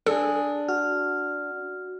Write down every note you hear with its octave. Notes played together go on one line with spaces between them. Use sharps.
D4 G#4 A4 G#5
F#4 F6